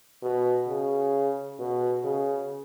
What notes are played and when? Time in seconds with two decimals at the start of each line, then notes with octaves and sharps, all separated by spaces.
0.23 B2
0.68 C#3
1.59 B2
2.04 C#3